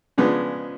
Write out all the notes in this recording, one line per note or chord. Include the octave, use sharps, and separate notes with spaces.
C#3 F3 G#3 B3 D4